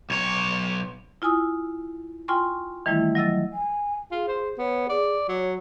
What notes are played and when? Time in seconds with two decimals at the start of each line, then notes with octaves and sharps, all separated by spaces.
0.10 B1 C#5
1.22 E4 F4 G#5 D#6 E6
2.28 F4 G5 G#5 C6 C#6
2.86 D#3 E3 G3 A3 E4
3.15 F#3 D#5 E6 A6
3.53 G#5
4.11 F4 G#4
4.28 C5
4.58 B3 C#5
4.89 G#4 D5
5.29 F#3 C#5